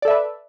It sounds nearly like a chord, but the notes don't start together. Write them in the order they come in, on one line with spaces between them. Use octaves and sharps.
D5 A4 E5 B4